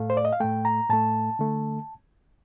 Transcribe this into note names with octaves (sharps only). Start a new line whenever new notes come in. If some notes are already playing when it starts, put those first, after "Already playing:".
Already playing: A2 A3 F5
C5
D5
D#5
F5
A2 A3 G5
A#5
A2 A3 A5
D3 A3